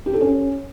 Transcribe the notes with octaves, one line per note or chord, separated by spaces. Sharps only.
G4
A4
C#4